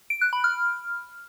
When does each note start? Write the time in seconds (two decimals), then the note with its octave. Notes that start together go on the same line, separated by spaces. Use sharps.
0.10 D7
0.21 F#6
0.33 B5
0.44 F6